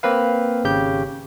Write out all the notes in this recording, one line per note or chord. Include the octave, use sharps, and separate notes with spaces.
A#3 C4 B4 F5
G#1 C#3 G4 G6